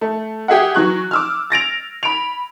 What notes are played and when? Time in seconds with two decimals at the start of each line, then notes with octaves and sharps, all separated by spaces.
0.01 A3
0.48 G4 G#4 E5 F#5
0.74 E3 F#3 C#6 F#6
1.11 D6 E6 F6
1.50 A6 A#6 D7 F7
2.03 B5 D7 F7